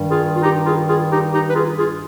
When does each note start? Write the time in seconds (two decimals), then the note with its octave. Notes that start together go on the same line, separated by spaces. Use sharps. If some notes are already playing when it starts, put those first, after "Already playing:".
Already playing: G2 D#3 G3
0.10 F4 G#4
0.35 F4
0.43 D#4 G4
0.65 F4 G#4
0.88 F4 G#4
1.11 D#4 G4
1.33 D#4 G4
1.49 B4
1.55 F4 G#4
1.78 F4 G#4